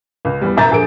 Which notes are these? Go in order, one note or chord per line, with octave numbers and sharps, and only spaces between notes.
C#2
E2 G3
E1 F#2 E5 A#5 G6 A6
A#1 G#4 A4 D7